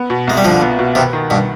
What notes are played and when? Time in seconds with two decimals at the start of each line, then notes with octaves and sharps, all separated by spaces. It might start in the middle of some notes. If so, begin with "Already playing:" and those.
Already playing: B3
0.10 B2
0.27 C2 G#3
0.37 G3
0.44 D3 F3 F4
0.61 B3
0.79 B2
0.95 C3 D#3 B3
1.13 D#3
1.30 G2 B2